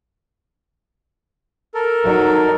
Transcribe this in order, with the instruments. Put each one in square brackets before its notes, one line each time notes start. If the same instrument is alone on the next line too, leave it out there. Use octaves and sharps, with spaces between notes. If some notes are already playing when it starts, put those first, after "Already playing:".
[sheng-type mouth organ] A4 A#4
[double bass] F#3 D#4